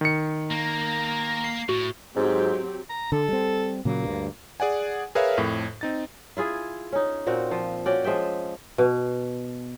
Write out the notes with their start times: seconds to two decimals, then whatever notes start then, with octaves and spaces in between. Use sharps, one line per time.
0.01 D#3 C#7
0.51 A#3 A#5
1.44 C7
1.69 A2 F#4
2.16 G#2 F#3 C4 G4
2.90 A#5
3.12 D3 A4
3.28 G3 C4
3.85 A#2 C#3 F#3 A#3
4.04 D2 G2
4.60 G#4 D5 F#5 G#5
5.15 G#4 A#4 B4 C#5 E5 F5
5.37 F2 A2
5.81 C4 D#4 A6
6.37 E4 F4 G#4
6.92 C#4 D#4
7.27 A#2 C4 F#4
7.51 F3
7.86 C#4 F#4 D5 G5
8.04 F3 G#3 E5 G5
8.78 B2